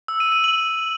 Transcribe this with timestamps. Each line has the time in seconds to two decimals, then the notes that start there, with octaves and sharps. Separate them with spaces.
0.08 E6
0.20 D#7
0.32 D#7
0.44 F#7